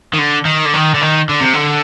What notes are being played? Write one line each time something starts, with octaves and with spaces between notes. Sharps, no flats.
D#3
D3
D#3
D3
D#3
D3
D#3
D3
C3
D3